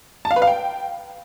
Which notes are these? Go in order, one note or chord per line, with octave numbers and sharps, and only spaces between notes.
A5
F5
B4
F5
G5